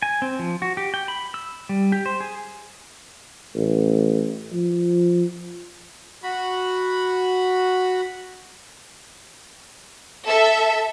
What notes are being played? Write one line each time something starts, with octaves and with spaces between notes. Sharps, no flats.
G#5
C4
F3
F#4
G4
G5
B5
E6
G3
G4
C5
G#4
A1
F3
F#4 B5
A4 E5